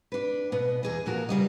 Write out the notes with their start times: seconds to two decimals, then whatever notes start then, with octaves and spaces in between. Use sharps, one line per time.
0.12 D4 B4
0.52 B2 B3
0.83 E2 G#4 D#5
1.06 A#2 F3 F#4 A#4
1.29 C#3 G3 D#5